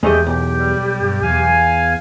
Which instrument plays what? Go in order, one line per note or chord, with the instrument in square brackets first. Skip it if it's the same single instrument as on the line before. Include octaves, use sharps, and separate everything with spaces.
[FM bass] E2 [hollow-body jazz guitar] G#3 A3 D#5 [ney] G4
[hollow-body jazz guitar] B1 [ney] G4
[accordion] G3
[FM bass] G2
[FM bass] E2 [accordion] F5 G#5